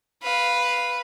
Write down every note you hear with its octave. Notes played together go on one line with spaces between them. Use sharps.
B4 F5